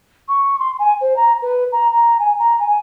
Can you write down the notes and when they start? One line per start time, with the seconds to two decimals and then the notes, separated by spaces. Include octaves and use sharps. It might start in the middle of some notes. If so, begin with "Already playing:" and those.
0.29 C#6
0.59 C6
0.79 G#5
1.01 C5
1.17 A#5
1.42 B4
1.72 A#5
1.91 A#5
2.20 G#5
2.39 A#5
2.60 G#5